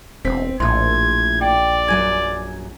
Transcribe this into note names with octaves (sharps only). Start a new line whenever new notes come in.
E1 C4 B6
A#1 A2 A3 C6 G#6
D5 G5
F#2 F#3 G#5 G#6